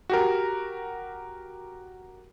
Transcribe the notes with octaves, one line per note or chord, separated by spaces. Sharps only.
F#4 G4 A#4